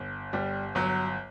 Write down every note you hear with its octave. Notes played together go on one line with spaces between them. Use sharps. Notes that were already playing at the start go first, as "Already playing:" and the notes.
Already playing: G1
G1 G3
G1 F#3